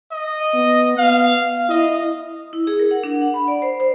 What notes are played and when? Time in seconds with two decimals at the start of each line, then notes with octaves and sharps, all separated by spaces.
0.11 D#5
0.54 B3
0.97 B3 F5
1.69 E4 D#5
2.53 E4
2.67 G#4
2.79 A#4
2.91 F#5
3.04 D4
3.22 F#5
3.34 B5
3.48 D5
3.62 C5
3.80 C5